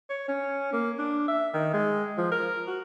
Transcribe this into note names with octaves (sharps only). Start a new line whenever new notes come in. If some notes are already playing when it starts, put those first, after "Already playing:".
C#5
C#4
A#3
D4
E5
D#3
G#3
F3
A#4
F#4